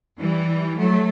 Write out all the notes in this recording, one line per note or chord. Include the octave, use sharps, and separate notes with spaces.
E3 G3
F#3 A3